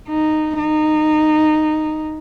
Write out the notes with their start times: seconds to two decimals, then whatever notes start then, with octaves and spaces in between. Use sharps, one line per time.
0.08 D#4
0.59 D#4